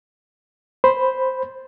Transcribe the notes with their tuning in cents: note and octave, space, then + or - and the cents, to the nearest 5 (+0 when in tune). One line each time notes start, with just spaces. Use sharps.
C5 +0 B5 +0